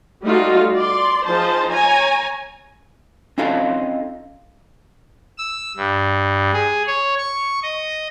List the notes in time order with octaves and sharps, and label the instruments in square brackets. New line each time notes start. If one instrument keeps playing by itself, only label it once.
[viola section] G3 A3 D#4 F4 F#4
D5 C6
F3 D#4 F4 G#4 C5 A5
C#5 G#5 A#5
[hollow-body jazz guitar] C4 C#4 D#4 F4 A4 F5
[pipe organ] E6
G2
G#4
C#5
C#6
D#5